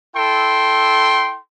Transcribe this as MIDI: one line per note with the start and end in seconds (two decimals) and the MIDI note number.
0.15 1.37 64
0.15 1.37 69
0.15 1.37 79
0.15 1.37 84